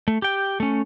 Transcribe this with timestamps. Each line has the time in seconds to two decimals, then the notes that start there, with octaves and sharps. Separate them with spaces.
0.08 A3
0.22 G4 G5
0.60 A3 C#4